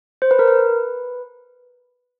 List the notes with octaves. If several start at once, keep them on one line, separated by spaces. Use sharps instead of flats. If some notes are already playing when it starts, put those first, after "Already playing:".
C5
B4
A#4
B4